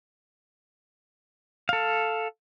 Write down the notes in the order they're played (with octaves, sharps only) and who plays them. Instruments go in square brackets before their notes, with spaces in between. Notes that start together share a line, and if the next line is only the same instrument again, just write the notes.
[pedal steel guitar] A4 F5